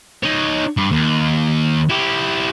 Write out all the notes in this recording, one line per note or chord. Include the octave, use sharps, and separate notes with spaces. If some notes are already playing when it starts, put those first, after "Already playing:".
D#4 C#5
G2
D#2
E4 G4